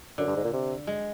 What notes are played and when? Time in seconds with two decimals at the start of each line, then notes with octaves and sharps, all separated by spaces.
0.18 F#2 D3
0.27 G2
0.36 G#2
0.44 A#2
0.53 C3
0.87 G#3